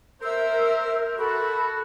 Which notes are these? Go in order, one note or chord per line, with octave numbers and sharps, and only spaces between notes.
A#4 C5 E5 E6
F#4 A4 B5